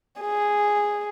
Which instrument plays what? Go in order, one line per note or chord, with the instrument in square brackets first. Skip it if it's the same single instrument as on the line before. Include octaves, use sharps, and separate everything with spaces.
[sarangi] G#4